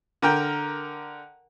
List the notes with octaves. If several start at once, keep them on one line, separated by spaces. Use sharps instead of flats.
D3 A#4 G5